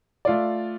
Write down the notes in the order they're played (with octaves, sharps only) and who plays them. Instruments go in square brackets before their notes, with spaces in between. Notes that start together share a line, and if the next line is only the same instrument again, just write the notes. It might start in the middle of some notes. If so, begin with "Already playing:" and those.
[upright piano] A3 F4 D5